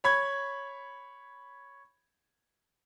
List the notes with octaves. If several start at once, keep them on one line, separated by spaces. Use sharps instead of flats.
C#5 B5 G#6